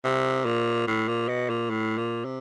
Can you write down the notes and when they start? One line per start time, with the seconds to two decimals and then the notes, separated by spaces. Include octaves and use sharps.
0.04 C3
0.46 A#2
0.87 A2
1.08 A#2
1.28 B2
1.50 A#2
1.70 A2
1.98 A#2
2.25 C3